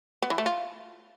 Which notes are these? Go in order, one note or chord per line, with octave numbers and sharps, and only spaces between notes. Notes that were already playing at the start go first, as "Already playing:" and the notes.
B3
E3
A3
F4